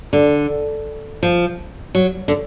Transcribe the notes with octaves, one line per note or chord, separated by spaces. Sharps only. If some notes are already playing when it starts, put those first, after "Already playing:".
D3
F3
F#3
D3